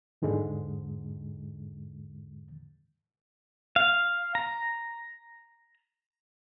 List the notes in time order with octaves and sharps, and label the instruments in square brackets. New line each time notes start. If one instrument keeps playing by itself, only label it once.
[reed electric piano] E2 G#2 D3 G#3
[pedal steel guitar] F5
A#5